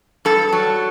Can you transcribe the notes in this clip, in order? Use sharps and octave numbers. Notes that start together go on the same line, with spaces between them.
G2 A4
F#3